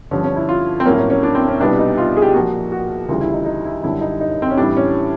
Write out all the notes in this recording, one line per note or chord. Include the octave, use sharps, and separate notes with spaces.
G2 D3 F3 C#4
C#4
E4
F4
C4
A2 F#3 A#3 C#4
C#4
C#4
D4
C4
C#4
C2 B2 G3 B3 D4
D#4
F4
G#4
G4
A#2 F3 A#3 F#4
F#4
D2 C#3 E3 G3 F4
E4
D#4
D#4
E4
F#2 D3 G3 E4
D#4
D#4
C4
C#4
A2 E3 G3 D4
C#4